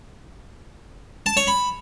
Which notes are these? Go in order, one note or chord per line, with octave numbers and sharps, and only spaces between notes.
A5
C#5
B5